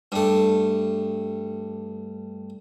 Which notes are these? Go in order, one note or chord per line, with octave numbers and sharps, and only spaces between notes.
G2 A3